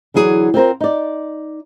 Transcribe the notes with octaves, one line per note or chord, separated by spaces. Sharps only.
D3 E3 F#3 G#4
C4 F4 A#4 C5
D#4 D5